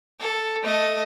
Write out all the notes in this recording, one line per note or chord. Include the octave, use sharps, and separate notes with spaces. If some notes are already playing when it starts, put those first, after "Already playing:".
A4
A3 D#5